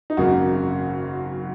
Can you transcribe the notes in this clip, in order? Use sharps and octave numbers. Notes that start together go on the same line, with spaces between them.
D#4
G#1 F#2 C#3 A#3 F#4